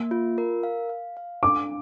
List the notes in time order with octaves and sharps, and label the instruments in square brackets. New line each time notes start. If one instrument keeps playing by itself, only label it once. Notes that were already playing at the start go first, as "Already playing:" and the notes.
Already playing: [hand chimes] A#3
F4
A#4
F5
F5
F5
[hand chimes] D4 [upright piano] D6